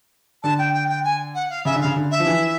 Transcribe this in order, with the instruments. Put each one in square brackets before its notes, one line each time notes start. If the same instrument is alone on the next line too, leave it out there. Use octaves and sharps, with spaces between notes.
[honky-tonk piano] D3 [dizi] A5
[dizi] G5
G5
G5
G#5
F#5
F5
[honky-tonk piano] C#3 [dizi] E5
[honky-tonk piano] D3
[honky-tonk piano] C#3 [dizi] F5
[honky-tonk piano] D3
[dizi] E5
[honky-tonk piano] F3
E3